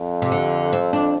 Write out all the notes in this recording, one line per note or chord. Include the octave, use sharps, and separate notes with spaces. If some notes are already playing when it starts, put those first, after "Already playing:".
Already playing: F2
C3
D3
C4
D4